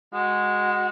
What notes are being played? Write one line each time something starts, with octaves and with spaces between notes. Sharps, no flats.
G#3 F#4